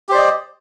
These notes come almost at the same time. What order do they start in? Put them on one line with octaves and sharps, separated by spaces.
G4 C5 D5 D#5